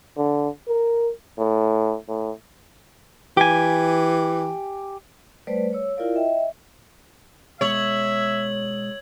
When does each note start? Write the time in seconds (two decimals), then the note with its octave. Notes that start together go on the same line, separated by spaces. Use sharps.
0.17 D3
0.68 A#4
1.38 A2
2.08 A2
3.37 E3 G4 G#5
5.47 G3 A3 B4 C5 D5
5.73 C#5 E6
5.97 E4 F4 A#4 D5 F5
6.15 D#5 E5 G5
7.61 B2 G#3 C#5 E5 E6 G#6 F#7